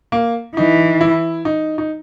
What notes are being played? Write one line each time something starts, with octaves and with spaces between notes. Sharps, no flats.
A#3
E3 D#4
E4
D#4
D#4